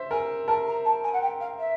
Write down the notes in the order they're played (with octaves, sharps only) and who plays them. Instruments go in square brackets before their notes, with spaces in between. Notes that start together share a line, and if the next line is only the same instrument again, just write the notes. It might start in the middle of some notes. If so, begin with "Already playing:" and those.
Already playing: [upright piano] C5 E5
[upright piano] A#4 [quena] G#5
[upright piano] A#4 [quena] A5
[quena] A#5
A5
G#5
F#5
G5
F5
E5